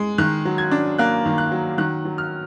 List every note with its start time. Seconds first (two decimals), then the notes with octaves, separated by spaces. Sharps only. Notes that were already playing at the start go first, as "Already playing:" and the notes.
Already playing: G#3
0.18 D#3 F#6
0.45 F#3
0.58 G#6
0.71 D4
0.99 A#3 F#6
1.26 D#3
1.38 F#6
1.52 F#3
1.78 D#3 F#6
2.05 F#3
2.18 F6